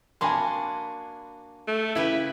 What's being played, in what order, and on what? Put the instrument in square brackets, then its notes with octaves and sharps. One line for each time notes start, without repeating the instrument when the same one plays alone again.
[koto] A#3 D4 F#4 [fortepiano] G#5 B5 C6
[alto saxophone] A3
[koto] C#3 G4 B4 [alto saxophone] E4